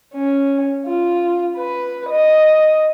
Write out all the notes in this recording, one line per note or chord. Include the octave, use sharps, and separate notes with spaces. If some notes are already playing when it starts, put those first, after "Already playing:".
C#4
F4
B4
D#5